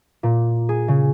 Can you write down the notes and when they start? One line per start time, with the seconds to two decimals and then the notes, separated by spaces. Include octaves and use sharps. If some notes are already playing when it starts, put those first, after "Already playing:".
0.23 A#2
0.69 G#4
0.88 C#3